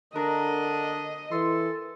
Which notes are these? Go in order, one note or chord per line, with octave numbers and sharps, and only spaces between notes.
D3 D4 A#4 D#5
E3 A4 C6